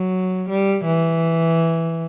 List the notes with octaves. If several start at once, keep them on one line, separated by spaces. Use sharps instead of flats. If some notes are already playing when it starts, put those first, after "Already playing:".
Already playing: F#3
G3
E3